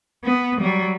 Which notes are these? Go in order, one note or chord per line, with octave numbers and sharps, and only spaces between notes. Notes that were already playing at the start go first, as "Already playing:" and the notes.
B3
F#3 G3